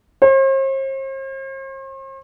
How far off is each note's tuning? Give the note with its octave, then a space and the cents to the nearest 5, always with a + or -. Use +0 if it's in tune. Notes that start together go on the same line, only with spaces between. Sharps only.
C5 +45